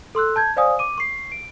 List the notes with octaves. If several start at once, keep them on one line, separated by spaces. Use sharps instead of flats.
A4 C6 E6 F#6
A5 G6 G#6
C5 D5 F5 G#5 D#6
D6 D#7
C#6 C7
D7